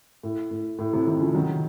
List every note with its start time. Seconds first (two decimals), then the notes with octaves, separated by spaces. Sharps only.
0.23 A2
0.51 A2
0.79 A2
0.93 A2 C3
1.06 C3 D#3
1.20 C#3 F3
1.34 D#3 F#3